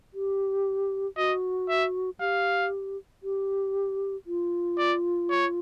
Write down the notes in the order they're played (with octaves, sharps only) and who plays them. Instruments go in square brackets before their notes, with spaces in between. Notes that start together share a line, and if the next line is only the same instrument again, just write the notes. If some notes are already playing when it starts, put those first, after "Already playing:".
[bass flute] G4
[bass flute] F#4 [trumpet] D#5
[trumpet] E5
[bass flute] G4 [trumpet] F5
[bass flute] G4
F4
[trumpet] D5
C#5